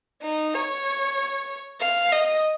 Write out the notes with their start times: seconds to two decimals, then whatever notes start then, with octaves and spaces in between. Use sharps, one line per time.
0.22 D#4
0.54 C#5
1.80 F5
2.12 D#5